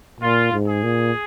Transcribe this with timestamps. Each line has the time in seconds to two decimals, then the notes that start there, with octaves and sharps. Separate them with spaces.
0.20 A#2 F4
0.52 G#2
0.67 G#4
0.83 A#2